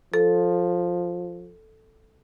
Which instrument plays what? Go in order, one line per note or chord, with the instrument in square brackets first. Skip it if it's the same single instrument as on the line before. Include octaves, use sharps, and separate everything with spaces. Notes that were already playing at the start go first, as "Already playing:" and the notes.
[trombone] F3 [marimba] A4